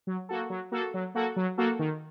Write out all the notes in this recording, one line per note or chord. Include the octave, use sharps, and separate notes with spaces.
F#3
A#3 F#4 A4
F#3
A#3 F#4 A4
F#3
A#3 F#4 A4
F#3
A#3 F#4 A4
D#3